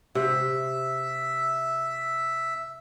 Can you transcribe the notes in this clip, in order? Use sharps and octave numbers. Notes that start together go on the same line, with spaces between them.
C3 E5